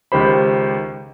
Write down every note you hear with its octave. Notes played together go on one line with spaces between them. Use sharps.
C#2 D#3 G4 C5 B5